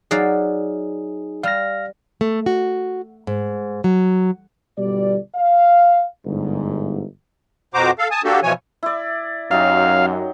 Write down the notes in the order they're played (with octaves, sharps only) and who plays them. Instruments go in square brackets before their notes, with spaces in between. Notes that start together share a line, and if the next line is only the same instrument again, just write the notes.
[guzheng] F#3 D5 F5 [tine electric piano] D#4 G#4
[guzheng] G3 [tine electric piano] F5 F6 A#6
[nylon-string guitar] A3
F#4
G#2
F#3
[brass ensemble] G1 B2 G3 D5
F5
G1 G#2
[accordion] F2 B2 F#4 C5 A#5 D6
A4 F5
G#5 A5 D#6
A#3 D4 F#4 G4 A4
B2 E3 F3 C#5 G#5
[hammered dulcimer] E4 D5
[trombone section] F#2 [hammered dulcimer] F#3 D#4 G4 [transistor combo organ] F5